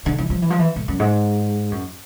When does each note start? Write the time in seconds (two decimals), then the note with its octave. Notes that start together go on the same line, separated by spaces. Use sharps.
0.06 D3
0.18 E3
0.30 F3
0.42 E3
0.50 F3
0.59 E3
0.76 A2
0.88 F#2
1.00 G#2
1.71 F#2